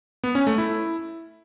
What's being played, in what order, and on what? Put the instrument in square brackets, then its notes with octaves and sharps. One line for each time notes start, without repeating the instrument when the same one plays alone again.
[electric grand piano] B3
C#4
A3
E4